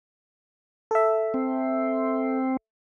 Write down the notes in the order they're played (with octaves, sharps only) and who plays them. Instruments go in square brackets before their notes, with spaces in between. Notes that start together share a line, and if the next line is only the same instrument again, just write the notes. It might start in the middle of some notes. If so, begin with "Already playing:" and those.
[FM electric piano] A4 E5
[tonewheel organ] C4